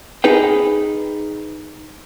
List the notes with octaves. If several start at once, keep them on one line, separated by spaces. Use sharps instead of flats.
D#4 G#4 B4 G5